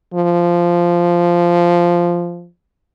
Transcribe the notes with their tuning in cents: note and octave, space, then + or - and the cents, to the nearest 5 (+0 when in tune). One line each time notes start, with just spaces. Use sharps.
F3 -10